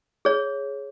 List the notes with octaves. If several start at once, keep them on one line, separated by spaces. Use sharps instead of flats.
G#4 C#5